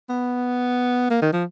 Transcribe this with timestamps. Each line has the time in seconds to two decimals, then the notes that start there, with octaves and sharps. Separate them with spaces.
0.09 B3
1.10 A#3
1.22 D#3
1.33 F3